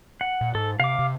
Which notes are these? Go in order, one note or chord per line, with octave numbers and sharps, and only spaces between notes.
F#5
A#2
G#2 A4
C3 F5 D6
C3